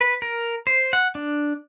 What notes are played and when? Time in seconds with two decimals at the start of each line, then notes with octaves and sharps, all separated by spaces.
0.01 B4
0.22 A#4
0.67 C5
0.93 F#5
1.15 D4